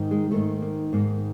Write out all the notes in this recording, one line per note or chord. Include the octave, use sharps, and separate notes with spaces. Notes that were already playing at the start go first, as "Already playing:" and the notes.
Already playing: G#2 D#3
G#3
G#2 D#3 A3
A#3
G#2 D#3 A#3